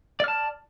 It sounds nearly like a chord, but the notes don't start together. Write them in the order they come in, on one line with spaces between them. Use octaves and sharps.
D5 F6 A5